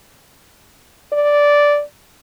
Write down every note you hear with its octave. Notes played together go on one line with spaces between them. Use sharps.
D5